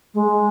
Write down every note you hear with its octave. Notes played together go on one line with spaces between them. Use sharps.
G#3